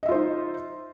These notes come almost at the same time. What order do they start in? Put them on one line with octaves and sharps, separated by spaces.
D#5 E5 F4 C5 D#4